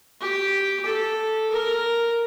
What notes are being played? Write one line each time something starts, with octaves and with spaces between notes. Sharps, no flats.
G4
A4
A#4